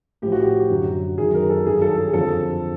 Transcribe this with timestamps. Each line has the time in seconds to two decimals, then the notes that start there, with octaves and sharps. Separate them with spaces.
0.22 A2 F3 G4
0.32 F#4
0.42 G4
0.70 F#2 D3 F#3
1.18 F#2 D#3 F#3 G#4
1.34 A#4
1.50 A4
1.66 G2 D#3 F#3 G#4
1.82 A4
1.98 G#4
2.13 F2 D3 F3 A4